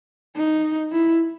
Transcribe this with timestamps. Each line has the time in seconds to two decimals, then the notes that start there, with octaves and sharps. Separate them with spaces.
0.36 D#4
0.92 E4